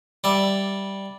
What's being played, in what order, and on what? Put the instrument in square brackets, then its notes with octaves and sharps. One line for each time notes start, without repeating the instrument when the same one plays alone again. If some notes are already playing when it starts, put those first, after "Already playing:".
[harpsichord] G3 E5